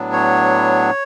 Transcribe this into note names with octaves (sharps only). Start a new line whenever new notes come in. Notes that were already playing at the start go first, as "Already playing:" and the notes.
Already playing: A2 F#3 B3 D4
C#5